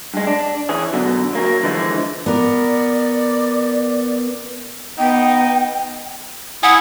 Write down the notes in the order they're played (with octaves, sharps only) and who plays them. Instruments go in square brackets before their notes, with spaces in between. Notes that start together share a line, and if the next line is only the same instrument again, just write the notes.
[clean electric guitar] G2 G#3
D4
E3 C#4 G#4
F#2 B2 D3
F#3 A#3 C#4
D3 E3 F3 G#3
[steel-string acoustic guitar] B3 A#4 [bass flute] D5
[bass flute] B3 [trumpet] D#4 [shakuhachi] G5
[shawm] E4 [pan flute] F#5 [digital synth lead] G#5 [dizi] D#6